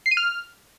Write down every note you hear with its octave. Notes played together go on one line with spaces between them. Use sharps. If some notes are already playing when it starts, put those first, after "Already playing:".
C7
D#7
F6